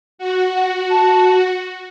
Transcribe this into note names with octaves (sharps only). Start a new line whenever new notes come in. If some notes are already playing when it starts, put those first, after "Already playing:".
F#4
F#5
A5